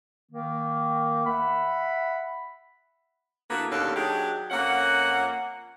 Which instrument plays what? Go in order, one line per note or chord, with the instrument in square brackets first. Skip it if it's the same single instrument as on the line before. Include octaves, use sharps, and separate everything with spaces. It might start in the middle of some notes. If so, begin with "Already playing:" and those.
[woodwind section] D#3 A#3
E5 F#5 B5
[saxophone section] D3 A#3 B3 E4 F#4 B4
D#2 B2 C#4 D4 A4 F5
F#3 D4 D#4 G4 G#4
F2 A#3 C#4 F#5